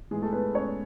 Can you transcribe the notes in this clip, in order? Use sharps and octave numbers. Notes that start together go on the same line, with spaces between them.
A2 E3 G#3 G#4
A3 A4
B3 B4
C#4 C#5